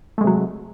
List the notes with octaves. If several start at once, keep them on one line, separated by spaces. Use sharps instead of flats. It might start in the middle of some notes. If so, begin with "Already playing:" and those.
C3 F#3 G#3 A3